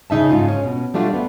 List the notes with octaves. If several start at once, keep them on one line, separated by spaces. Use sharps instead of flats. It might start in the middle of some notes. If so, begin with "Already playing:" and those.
C#3 D#4 E5 A5
G#2 F4
C#4
B2
G3 A3 D4 F4 F#4
B3